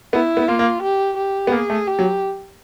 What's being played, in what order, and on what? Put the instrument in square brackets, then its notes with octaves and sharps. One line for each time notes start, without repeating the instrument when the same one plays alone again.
[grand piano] B3 [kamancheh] E4
[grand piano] B3
[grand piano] A#3 [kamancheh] F4
[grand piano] A#3
[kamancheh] G4
G4
[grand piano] B3
[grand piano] A#3 [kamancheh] G#4
[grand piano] A3
[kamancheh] G4
[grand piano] F#3